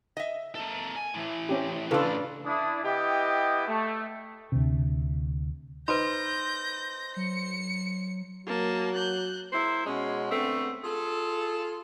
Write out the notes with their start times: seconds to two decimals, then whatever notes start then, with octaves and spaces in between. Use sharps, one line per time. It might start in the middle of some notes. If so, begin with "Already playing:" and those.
0.17 D#5 E5
0.55 A#3 A4
0.96 G#5
1.14 A2 E3
1.49 C4 C#4 G4
1.91 C#3 D4 F4 A4 B4
2.45 D4 E4 D#6
2.83 B3 E4 G4 D#5 G5 D#6
3.67 A3
4.52 D2 C3
5.88 D#4 B4 C5 C6 G6 A#6
7.16 F#3 C#7
8.47 F#3 A#3 A5
8.95 F#6 G6
9.53 A#3 E4 G#4 C5
9.86 B2 G#3 C#4
10.31 D3 A3 B3 C4
10.83 F4 G#4 A4